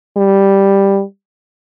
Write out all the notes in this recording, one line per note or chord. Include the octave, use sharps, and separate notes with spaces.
G3